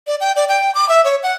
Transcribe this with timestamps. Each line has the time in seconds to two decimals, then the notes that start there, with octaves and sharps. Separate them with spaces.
0.07 D5
0.21 G5
0.36 D5
0.49 G5
0.75 D6
0.89 E5
1.05 C#5
1.23 F#5